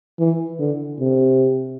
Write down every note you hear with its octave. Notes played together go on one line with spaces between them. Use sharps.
E3
D3
C3